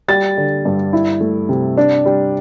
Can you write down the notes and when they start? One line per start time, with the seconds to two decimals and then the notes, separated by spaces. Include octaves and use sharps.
0.08 G3 A6
0.37 D3
0.65 G2
0.93 E4
1.20 A3
1.49 C3
1.77 D4
2.06 G3